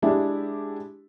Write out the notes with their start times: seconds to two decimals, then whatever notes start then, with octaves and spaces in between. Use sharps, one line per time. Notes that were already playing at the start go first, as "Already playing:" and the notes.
0.02 G#3 D4 E4 G4 G#4 E5